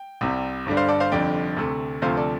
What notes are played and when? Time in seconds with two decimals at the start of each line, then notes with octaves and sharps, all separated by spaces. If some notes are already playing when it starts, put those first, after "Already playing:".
Already playing: G5
0.21 C2 C3 G3
0.66 G1 G2 D3 G3
0.77 C5 F5
0.88 A4 D5
1.00 C5 F5
1.12 F1 F2 D3 G3 D5 G5
1.57 D2 C3 A3
2.02 D2 C3 F3 A3 C5 F5
2.17 A4 D5